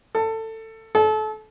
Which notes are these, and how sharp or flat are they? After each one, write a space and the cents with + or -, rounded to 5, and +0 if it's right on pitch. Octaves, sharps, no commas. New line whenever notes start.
A4 +20
A4 -30